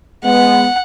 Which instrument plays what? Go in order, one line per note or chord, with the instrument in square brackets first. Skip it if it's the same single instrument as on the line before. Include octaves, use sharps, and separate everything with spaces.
[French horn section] G#3 B3 [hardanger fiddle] F#5